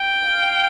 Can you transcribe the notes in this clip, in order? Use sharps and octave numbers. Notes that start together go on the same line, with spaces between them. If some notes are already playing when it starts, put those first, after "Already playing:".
Already playing: G5
F5